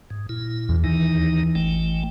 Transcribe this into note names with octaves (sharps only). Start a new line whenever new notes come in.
G#2
A#2 E4
E2
D#2 D#3 E3 D#4
G#1 A3 G5